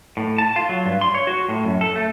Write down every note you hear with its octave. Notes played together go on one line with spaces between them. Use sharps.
A2
A5
F4
F#3
G2
C6
C#5
F#4
A2
F#2
A4
A3